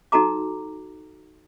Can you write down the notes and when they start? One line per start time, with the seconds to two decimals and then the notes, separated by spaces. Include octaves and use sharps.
0.12 D#4 F#4 A4 A#5 D6